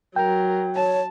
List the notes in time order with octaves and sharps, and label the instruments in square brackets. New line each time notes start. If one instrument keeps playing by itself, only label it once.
[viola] F#3 [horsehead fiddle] A#4 [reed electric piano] G5
[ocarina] C#5 [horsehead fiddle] A5